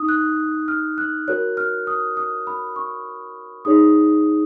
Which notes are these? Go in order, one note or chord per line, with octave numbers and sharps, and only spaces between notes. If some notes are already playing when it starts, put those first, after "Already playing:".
Already playing: D#4 D#6
F#6
F6
F#6
F#4 A#4 C#5 F#6
F6
D#6
D#6
B5
C#6
D#4 G#4 C#5 D#6